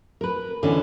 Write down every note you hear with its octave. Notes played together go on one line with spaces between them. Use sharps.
A#4 B4
B2 D3 E3 B3 C#4